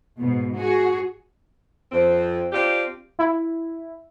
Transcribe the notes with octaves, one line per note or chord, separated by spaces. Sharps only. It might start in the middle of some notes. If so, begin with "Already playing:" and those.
G#2 B2
F#4 G#4
F2 C4
C4 D4 F4 G4
E4